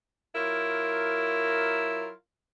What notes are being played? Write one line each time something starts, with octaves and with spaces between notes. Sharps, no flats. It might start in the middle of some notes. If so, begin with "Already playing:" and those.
F#3 E4 F4 A#4